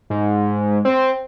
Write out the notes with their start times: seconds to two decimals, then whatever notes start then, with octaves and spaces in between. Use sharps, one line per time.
0.10 G#2
0.85 C4